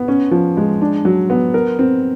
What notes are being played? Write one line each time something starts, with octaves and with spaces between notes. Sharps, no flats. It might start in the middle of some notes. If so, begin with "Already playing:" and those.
Already playing: B3
C#4
F3
G#3
D4
F#3
B3
A#4
C4